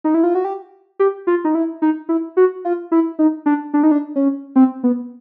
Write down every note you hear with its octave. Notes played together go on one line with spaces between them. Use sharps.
D#4
E4
F4
F#4
G4
G4
F4
D#4
E4
D#4
E4
F#4
F4
E4
D#4
D4
D4
D#4
D4
C#4
C4
B3